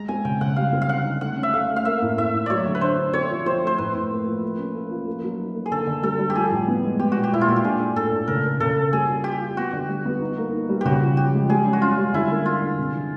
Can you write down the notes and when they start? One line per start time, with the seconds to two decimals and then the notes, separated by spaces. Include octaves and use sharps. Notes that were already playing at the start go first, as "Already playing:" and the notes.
Already playing: G#3 A#5
0.08 C4 G#5
0.25 C#3 G5
0.41 C#3 F#5
0.56 G3 F5
0.73 C4
0.82 F5
0.88 D3 F#5
1.05 D#4
1.21 A3 F#5
1.37 C#4
1.43 E5
1.53 A3 F5
1.70 A3
1.76 F5
1.85 A#3 E5
2.02 A2
2.17 A2 E5
2.34 A2
2.46 F#3 C#5 D5
2.66 D3
2.75 B4
2.81 D4 C5
2.98 D4
3.13 C4 C#5
3.30 F3
3.46 C4 C5
3.62 A3
3.67 C5
3.78 A2 B4
3.95 A2
4.11 A#3
4.26 F3
4.43 A#3
4.59 C#4
4.75 A#3
4.91 F3
5.07 A#3
5.23 F#3
5.39 D#4
5.55 A#3
5.66 G#4
5.71 D3 A4
5.87 D3
6.03 G3 A4
6.19 G3
6.30 G4
6.35 F3 G#4
6.51 A2
6.68 B3
6.84 G#3
6.99 B3 G4
7.12 A#2 F#4
7.24 G4
7.32 A#2 E4
7.41 F4
7.48 A#2 F#4
7.56 G4
7.64 D4 G#4
7.79 D4
7.95 A2 A4
8.12 A2
8.28 C#3 A#4
8.44 A#3
8.60 C#3 A4
8.76 A#3
8.92 G3 G#4
9.08 F4
9.24 F4 G4
9.41 F4
9.56 B3 F#4
9.73 D3
9.89 G3
10.05 B3
10.22 D#4
10.38 A#3
10.53 D#4
10.69 G3
10.81 C#3 F#4 G4
11.02 F3
11.17 F3 G4
11.34 G#3
11.49 G3 G#4
11.65 C#4
11.73 F#4
11.82 C#4 F4
11.97 G3
12.14 D3 E4
12.30 A#3
12.45 A#3 F4
12.61 D3
12.78 C3
12.94 E3